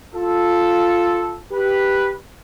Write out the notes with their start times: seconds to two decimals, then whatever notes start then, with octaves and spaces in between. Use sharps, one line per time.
0.15 F4 A4
1.52 G4 B4